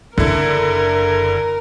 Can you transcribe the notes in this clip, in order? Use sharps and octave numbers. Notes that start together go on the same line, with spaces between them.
F#1 D3 E4 A#4